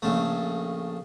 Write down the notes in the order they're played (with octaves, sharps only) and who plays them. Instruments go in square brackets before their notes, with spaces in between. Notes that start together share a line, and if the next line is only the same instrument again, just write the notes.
[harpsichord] A#1 C#3 A3